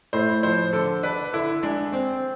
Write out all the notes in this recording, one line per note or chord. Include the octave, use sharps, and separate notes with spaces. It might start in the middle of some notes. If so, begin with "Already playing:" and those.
A2 C5
F3 C5
D3 A4
D4 B4
D3 E4
G#3 D4
C4